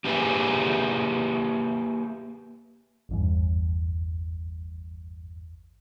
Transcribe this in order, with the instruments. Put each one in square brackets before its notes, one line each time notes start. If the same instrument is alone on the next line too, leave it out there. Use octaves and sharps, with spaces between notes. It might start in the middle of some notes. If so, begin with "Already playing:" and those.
[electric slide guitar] A#3 G4 G#4 B4 E5 G#5
[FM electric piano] G#1 E2 G2